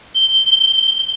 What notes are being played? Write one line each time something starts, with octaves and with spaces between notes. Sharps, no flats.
G7